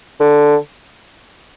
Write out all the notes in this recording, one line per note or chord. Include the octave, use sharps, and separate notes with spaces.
D3